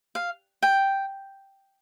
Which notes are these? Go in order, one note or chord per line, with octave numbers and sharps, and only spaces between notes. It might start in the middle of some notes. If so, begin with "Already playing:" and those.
F5
G5